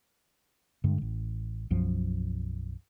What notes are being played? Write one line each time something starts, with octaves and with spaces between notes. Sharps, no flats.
G2 D3 G#3
A1
B1 F#2 F3 F#3